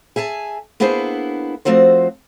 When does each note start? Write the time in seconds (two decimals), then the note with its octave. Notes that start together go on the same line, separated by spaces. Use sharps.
0.16 G#4 E5 G#5 A5
0.80 A#3 B3 D4 E4 G#4 C5
1.65 F3 A3 C4 F#4 C5